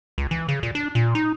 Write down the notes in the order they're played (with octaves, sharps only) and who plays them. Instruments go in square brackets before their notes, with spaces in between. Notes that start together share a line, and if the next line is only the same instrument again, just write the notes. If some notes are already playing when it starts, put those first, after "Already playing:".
[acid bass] C#2
E3
C#3
A#2
D4
A#2
D#4